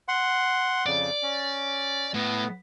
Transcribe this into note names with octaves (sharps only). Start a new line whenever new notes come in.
F#5 C6
F2 C#3 D5
C#4
A2 B3